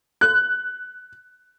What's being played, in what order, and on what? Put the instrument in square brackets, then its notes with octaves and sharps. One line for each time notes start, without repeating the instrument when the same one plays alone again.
[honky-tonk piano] F#6